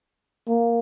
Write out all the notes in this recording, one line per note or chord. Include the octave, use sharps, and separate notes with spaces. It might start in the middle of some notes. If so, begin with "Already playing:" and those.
A#3